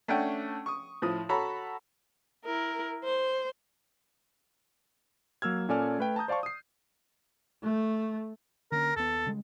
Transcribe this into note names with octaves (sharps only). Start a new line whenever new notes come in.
A3 C#4 D4 F#5 G5
C#6 D#6
A2 F3 D#6
F#4 A4 C#5 A#5 B5
E4 A#4
C5
F#3 A#3 E6 F6 G#6
A#2 C#4 A4 D5 G#5 F6
A3 B4 G5
A5 A#5 D#6 G6
C5 D5 F5 A5 C#6
D#6 C7
A3
D3 A#3 C#4 A#4
D#2 B3 A4
C#3 G3 G#3